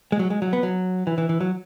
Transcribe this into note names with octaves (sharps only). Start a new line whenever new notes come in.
G#3
F#3
G#3
F#3
B3
F#3
E3
E3
E3
F#3